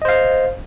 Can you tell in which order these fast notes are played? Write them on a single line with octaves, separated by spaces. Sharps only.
D#5 C5 F5